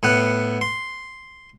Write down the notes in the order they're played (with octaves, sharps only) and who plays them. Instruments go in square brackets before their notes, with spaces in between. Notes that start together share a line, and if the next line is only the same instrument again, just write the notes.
[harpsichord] A2 B3 F#5
C6